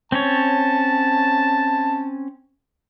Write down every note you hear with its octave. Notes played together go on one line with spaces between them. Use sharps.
C4 C#4 C#5 A5